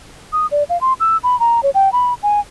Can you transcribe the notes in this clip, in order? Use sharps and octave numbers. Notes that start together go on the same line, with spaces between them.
D#6
D5
F5
C6
E6
B5
A#5
C#5
G5
B5
G#5